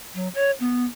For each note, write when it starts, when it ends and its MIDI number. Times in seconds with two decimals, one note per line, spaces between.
0.14 0.28 54
0.35 0.51 73
0.60 0.85 59